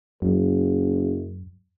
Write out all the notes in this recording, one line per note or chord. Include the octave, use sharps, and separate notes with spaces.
F#1 F#2